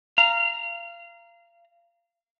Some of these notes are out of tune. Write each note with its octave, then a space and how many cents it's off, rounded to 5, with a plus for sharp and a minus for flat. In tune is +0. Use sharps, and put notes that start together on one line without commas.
F5 -25 A#5 +0